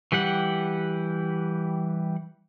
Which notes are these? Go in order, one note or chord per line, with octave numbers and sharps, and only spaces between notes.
E3 G3 G4 F#5